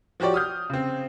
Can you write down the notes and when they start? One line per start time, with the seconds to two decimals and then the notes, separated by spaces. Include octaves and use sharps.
0.20 F3 F#4 G4 C#5 D5
0.34 D#6 F6 G6
0.70 C#3 C4